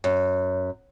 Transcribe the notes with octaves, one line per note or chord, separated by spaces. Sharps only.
F#2